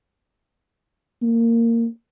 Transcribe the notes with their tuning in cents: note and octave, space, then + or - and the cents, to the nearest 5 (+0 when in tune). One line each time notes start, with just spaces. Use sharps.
A#3 -15